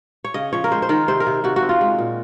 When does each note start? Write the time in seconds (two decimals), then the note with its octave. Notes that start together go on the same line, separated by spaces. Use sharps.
0.24 C#5
0.34 C#3 D#5
0.53 F3 C#5
0.64 A#4
0.71 G#3 C5
0.82 C5
0.89 D#3 A#4
1.08 C3 C5
1.20 A#4
1.27 C3
1.44 C3 F#4
1.56 F#4
1.62 C4
1.69 F4
1.81 G#3
1.99 A#2